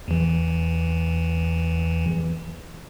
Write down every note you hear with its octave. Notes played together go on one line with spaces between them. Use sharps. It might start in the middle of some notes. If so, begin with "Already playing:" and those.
E2 E3